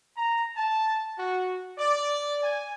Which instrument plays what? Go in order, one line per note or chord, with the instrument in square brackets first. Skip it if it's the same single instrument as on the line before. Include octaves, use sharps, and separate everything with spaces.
[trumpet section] A#5
A5
F#4
D5
G#5